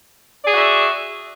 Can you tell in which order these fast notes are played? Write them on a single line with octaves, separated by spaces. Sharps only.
D5 G#4 F#4 E5